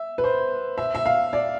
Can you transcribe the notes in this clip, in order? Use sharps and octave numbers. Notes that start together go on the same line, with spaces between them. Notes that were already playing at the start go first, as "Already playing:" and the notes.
Already playing: E5
B4
C5
E5
E5
F5
D5